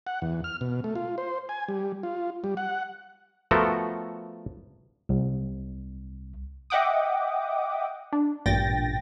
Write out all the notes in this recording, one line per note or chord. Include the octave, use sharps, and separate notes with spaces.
F#5
E2
F6
B2
A3
F4
C5
G#5
G3
F4
G3
F#5
F3 A3 B3 F#4 A4 A#4
C2
D#5 E5 F#5 G5 D6 D#6
D4
A1 G2 A#2 G5 A6 A#6